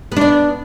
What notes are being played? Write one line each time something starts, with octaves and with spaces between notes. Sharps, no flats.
B3 D4 D5